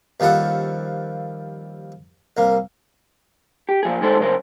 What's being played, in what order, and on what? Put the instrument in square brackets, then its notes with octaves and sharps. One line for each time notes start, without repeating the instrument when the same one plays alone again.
[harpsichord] D#2 F3 G3 A4 F#5
C2 A#3
[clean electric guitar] G4
A#2 F3 G#4
D#3 G#3 A4 C5
F#2 C#3 A#4 C5